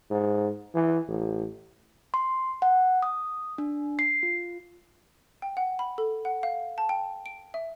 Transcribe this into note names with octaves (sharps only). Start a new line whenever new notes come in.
G#2
E3
A1
C6
F#5
D#6
D4
C7
F4
G5
F#5
B5
A4
F#5
F5
A5
G5
D7
E5